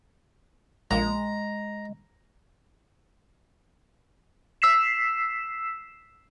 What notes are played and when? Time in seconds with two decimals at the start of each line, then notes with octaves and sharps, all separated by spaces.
0.91 A#1 A#2 G#3 A#5
4.62 E6 B6 C7 E7